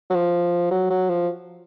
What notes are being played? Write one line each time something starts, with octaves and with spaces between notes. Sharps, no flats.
F#3
F3
F#3
F#3
F3